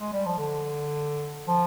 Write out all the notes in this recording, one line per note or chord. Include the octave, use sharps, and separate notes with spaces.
G#3
G3
F3
D3
F3